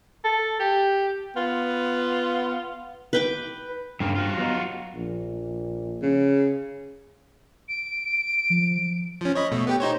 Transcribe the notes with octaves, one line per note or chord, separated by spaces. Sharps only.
A4
G4
B3 F4
B4 G5 D6
G2 C#3 A#3 C4
F4 F#4
F#3 B3 D#4
A#1
C#3
D7
F3
F3 C#4
C#5 D#5 B5
B2 A3
B3 G4 G5
D#4 C5 C#5